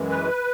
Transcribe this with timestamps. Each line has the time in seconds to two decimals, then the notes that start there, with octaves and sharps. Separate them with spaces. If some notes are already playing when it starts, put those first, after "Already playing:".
Already playing: F#2 E3 G#3
0.10 B4